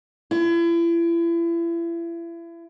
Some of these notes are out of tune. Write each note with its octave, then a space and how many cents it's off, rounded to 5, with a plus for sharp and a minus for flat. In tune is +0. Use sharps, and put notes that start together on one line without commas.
E4 +35